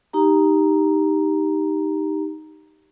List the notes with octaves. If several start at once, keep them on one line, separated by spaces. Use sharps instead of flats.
D#4 G4 A#5